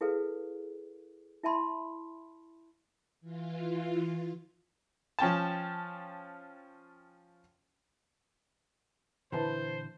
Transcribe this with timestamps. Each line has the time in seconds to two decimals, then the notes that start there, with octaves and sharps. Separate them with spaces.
0.01 E4 G#4 A4 B4 F5
1.43 E4 E5 A5 B5 C6
3.21 E3 F4
5.19 F3 C#4 G5 A5
9.32 A#2 D3 E3 E4 B4 C5 A5